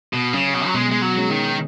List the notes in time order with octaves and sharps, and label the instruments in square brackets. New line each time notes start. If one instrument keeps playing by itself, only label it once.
[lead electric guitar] B2
[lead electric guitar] C#3 [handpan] F#3 C#4
[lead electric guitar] B2
F#3
[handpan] B2 [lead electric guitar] G#3
[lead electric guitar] G#3
F#3
[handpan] G#3 C#4
[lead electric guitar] D#3